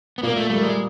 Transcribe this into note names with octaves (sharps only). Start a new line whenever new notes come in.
B3
A#2 A#3
A3
G3 A3 A#3
G#3